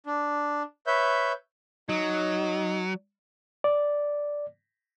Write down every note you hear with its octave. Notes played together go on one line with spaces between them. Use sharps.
D4
B4 C#5 E5 G6
F#3 D#4
D5